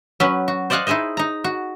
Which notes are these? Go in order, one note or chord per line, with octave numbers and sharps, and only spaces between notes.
F#3 C#4 B4
F#4
C5 D5 D#5 F5 F#5 G#5
D#4 E4 G#4 C5 D#5
D#4 A#5
F#4